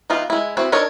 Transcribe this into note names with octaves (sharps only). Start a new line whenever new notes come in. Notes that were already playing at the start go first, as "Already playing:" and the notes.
E3 B3 D#4 F4
G#3 E4
B3 C4 E4 F#4 B4
D4 D#4 A4 A#4 C#5